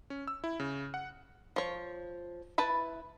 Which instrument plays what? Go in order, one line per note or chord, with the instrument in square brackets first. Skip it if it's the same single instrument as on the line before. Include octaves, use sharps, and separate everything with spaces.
[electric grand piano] C#4
E6
E4
C#3
F#5
[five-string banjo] F3 C#5
E4 B4 A5 B5